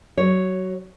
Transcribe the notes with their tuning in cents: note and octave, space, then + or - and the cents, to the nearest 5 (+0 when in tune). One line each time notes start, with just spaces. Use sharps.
F#3 +20 C#5 +0